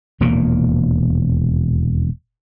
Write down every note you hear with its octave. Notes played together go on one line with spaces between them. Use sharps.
E1 D#2 A#2 A#3